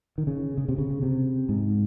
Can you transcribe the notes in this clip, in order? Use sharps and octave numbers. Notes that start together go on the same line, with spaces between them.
D#3
C#3
C#3
C3
C#3
C3
G#2